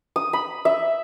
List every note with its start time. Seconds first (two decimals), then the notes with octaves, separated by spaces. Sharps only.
0.16 D#6
0.33 B5
0.65 E5